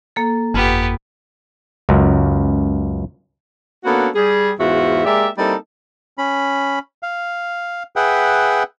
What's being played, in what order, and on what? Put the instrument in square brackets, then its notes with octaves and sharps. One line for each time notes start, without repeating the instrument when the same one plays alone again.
[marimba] A#3 A4
[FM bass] G1 [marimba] F2 F4 [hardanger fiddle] B3 G4
[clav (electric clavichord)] C#2 F#2
[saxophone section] A#3 B3 C#4 D4 F#4 A4
G3 G#4
E2 G#2 F4 F#4 E5
G#3 A#3 G4 D5 E5
G3 A#3 C4 D#4 E4 A4
[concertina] C#4 B5
F5
G#4 B4 E5 F#5 G5